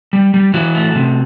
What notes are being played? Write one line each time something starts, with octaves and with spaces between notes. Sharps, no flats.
G3
G3
E3 F#4
A3
C3